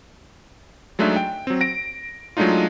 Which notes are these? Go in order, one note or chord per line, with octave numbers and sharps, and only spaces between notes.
F#3 G#3 A3 D4 D#4 E5
G5
F#3 C4
A#6 D7
F#3 G#3 A3 D4 D#4 F4